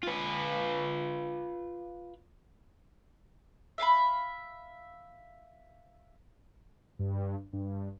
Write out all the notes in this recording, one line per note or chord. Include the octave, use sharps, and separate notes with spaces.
F4 B4
E5 F5 G#5 B5
G2
G2